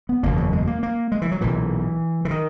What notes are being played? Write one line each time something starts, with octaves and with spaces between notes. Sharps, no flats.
B3
F#1 E2 B2 A#3
F#3
G#3
A#3
A#3
G#3
E3
F#3
B1 A#2 E3
E3
D#3